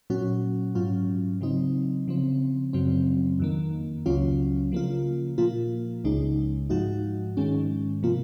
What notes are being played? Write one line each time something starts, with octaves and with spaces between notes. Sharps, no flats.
A#2 F#3 C#4 F#4
G#2 F#3 C#4 F4
C#3 F#3 C4 D#4
C#3 F3 C4
F#2 C#3 F#3 C4
F2 D#3 A#3
C#2 C#3 F#3 C#4 F4
C#3 F3 A#3 F4
A#2 F3 A#3 F4
C#2 C#3 G#3 D#4
G#2 F3 G#3 D#4 F#4
G#2 D#3 G#3 C#4
C3 F3 A#3 F4